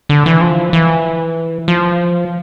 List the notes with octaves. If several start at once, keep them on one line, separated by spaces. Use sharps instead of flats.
D3
E3
F3
E3
F3